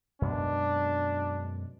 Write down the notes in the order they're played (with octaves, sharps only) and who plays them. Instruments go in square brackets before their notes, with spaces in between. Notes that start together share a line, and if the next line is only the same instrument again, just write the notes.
[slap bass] F#2 B2 G#3 [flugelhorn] D4